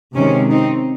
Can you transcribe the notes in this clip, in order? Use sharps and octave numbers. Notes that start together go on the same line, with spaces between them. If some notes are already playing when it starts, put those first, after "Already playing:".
C3 D#3 G#3 C4 C#4
C4 D#4